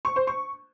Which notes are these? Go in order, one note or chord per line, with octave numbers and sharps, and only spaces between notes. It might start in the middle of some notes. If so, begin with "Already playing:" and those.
C#6
C5
C#6